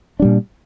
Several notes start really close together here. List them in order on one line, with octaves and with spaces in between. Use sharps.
D4 G3 A#2